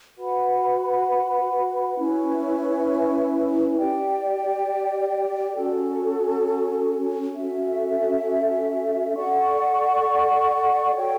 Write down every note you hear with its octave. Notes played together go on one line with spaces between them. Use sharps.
F#4 B4 F#5 B5
C#4 E4 B4
G4 D5 G5
C#4 F#4 A4
C#4 F#4 A4 E5
A4 D5 F#5 C#6
F#4 A4 C#5 G5